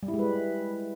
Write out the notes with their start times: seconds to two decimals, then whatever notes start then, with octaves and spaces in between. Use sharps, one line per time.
0.03 G3
0.08 E4
0.14 G#3
0.19 B4